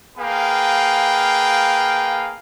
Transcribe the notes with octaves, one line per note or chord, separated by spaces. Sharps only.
A#3 G#4 B4 F5 G5